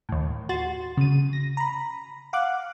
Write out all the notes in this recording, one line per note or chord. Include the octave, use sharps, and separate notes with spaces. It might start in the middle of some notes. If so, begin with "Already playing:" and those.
D#2 A2
F#4 C6 A6
C#3 D#7
A#6
A#5 B5
F5 F#5 D6 F#6